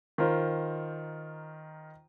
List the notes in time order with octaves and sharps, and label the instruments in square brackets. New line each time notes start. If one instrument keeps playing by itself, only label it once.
[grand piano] D#3 F4 A#4 C5